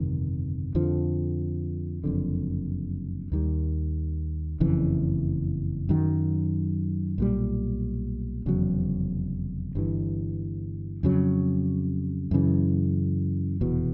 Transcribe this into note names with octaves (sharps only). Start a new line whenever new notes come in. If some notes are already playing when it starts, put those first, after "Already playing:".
Already playing: G1 F2 C3 D#3
F2 D3 F3
F#1 F2 D3
D#2 D#3 G3
F#1 F2 C#3 E3
F#2 D#3 F#3
B1 A#2 G3
F1 E2 C#3 F#3
G1 G2 E3
F2 C#3 F#3
F#2 C#3 E3
F1 E2 B2